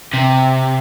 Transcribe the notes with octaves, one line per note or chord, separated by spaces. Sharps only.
C3